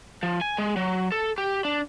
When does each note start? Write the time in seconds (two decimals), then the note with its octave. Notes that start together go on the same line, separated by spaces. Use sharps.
0.23 F3
0.41 G#5
0.58 G#3
0.76 F#3
1.12 A4
1.38 G4
1.65 D4